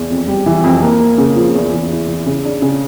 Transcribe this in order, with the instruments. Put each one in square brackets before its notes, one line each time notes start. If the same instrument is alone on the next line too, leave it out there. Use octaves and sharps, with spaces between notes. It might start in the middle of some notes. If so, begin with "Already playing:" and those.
Already playing: [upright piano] E2
F2
G3
E3
F2
A#3
A#3
C#3
F3
E2
E3
E4
E3
C#3
D4
C#3